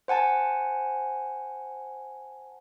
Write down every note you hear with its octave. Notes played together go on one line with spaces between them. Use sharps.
C5 F#5 G#5 A5